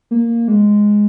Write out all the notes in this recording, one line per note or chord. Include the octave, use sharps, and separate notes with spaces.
A#3
G#3